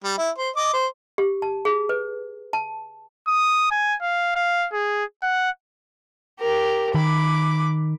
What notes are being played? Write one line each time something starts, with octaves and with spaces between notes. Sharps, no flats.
G3
E4
C5
D#5 D6
C5
G4
A5
G#4
B4
A5
D#6
G#5
F5
F5
G#4
F#5
G4 A#4
D#3 B5 D6